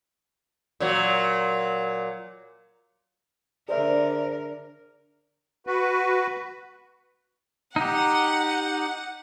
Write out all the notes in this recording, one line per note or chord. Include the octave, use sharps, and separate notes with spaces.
A#2 F#3
D3 G#4 A#4 C5 D5 E5
F#4 B4
D#4 G4 F#5